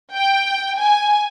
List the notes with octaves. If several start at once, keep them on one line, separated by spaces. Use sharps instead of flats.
G5
G#5